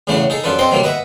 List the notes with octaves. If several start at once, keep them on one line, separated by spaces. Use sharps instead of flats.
E2 A2 C#3 A3 E4 F#5
D#4 G#4 A4
F#2 D4 F4 A4 B4
C4 A4 D#5 C6
B2 D3 F#3 G3 A#3
B4 D#5 E5 F#5